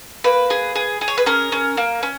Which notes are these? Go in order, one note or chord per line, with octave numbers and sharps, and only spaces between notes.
A#3 B4
G#4
G#4
G#4
C#5
B4
C#4 A#4
C#4
A#3
C#4